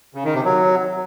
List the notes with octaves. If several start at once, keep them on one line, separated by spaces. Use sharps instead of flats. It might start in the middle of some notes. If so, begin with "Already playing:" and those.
C#3
D#3
C3
F#3